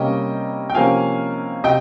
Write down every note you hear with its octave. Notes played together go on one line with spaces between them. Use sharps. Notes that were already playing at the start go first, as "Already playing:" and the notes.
Already playing: C3 G3 A#3 C#4 D#5 G5
G5
C3 F3 A#3 C#4 F5 G#5
C3 D#5 G5